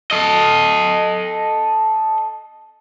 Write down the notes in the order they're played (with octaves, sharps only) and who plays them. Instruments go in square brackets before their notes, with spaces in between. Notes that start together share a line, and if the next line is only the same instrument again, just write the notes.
[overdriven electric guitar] A4 D#5